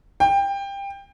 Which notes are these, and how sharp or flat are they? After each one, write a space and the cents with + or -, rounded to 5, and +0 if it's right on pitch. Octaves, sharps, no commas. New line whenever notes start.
G5 +20